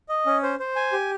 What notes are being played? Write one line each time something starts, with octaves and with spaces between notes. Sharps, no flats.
D#5
C#4
C5
C5
G#5
G4